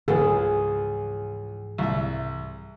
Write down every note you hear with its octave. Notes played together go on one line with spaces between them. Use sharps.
C#2 G#2 E3 F3 G#4 A4 B4
C2 E5